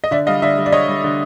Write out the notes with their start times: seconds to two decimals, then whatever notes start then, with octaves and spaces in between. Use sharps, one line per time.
0.04 D#5
0.11 D3 D5 E5
0.27 G3 D#5 F5
0.42 D3 D5 E5
0.58 G3
0.66 D5
0.72 D3 C#5 D#5
0.88 G3
1.04 D3